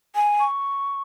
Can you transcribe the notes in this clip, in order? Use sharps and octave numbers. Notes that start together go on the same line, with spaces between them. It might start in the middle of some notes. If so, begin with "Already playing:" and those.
G#5
C#6